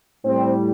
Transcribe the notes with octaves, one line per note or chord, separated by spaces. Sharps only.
A2 G3 C4